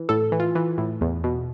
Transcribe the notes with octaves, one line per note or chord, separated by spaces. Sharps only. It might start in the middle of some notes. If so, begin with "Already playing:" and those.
Already playing: E3
A2 A4
E3
F4
E3
A2
E2
B2